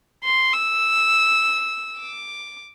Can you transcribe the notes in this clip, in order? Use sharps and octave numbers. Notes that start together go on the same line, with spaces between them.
C6
E6
D6